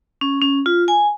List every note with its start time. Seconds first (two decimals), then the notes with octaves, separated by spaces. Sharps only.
0.21 C#4
0.41 C#4
0.66 F4
0.88 G#5